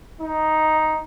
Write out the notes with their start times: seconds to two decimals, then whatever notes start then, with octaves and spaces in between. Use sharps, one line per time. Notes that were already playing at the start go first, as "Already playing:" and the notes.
0.21 D#4